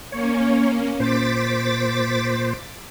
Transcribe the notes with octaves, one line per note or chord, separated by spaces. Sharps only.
A#3 C#4 C#5
A#2 C5 D6 A6 B6